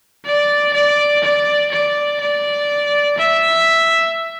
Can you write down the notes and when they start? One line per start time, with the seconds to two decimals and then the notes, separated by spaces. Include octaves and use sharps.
0.25 D5
0.74 D5
1.23 D5
1.72 D5
2.20 D5
3.18 E5